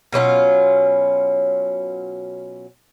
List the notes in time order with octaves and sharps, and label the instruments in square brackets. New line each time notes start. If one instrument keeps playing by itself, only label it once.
[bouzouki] B2 F#3 C#4 F4